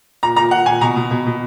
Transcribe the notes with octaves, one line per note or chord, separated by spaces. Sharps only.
A#2 A#5
A#2 A#5
A#2 F#5
A#2 G#5
B2 A#5
B2
B2
B2